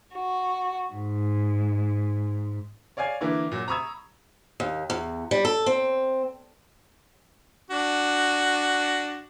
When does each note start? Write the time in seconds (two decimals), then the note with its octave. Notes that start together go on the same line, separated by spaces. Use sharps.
0.15 F#4
0.93 G#2
2.97 C#5 D5 F5 G#5 G#6
3.21 D3 E3 A#3 E4
3.52 A#2 F#3
3.68 A#5 B5 C#6 D#6 E6 G#6
4.60 D#2
4.90 E2
5.31 G3
5.45 A4
5.66 C4
7.71 D4 F#4